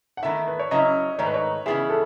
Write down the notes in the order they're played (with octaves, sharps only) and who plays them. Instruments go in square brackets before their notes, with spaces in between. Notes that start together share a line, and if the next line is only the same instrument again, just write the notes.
[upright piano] F#5
[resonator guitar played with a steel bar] E2 D#3 A3 E4 [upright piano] E5
[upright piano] B4
C#5
[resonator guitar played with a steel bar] C#3 F#3 C#4 E4 [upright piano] D#5
[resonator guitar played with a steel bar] G#2 D#3 A3 D#4 [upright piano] C#5
[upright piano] B4
C#5
[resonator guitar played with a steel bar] C#3 E3 B3 E4 [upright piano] G#4
[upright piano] A4